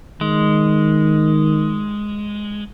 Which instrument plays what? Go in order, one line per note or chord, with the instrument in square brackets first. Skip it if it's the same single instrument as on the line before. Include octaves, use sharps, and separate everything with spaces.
[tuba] D#3 [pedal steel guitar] G#3